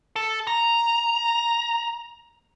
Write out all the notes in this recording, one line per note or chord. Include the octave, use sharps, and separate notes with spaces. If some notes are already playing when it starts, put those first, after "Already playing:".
A4
A#5